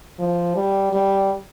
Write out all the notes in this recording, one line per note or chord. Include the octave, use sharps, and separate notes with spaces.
F3
G3
G3